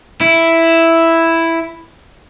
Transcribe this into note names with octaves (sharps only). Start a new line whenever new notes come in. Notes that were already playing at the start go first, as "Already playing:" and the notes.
E4